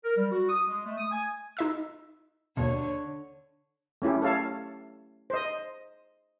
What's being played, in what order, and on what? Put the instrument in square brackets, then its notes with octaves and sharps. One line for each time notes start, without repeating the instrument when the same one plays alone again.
[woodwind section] A#4
G3
F#4
D#6
G#3
A3
D#6
G#5
[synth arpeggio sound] D#4 D#5 E6
[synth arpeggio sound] D#2 B2 [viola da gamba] D3 C#5
[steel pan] A3 C#4 E4 G4
A4 C#5 F5 A5
C5 D#5